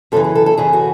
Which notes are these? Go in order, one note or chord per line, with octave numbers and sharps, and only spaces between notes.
F#2 C#3 E3 A4
G#4
A4
A4
F#2 C#3 E3 G#4
F#4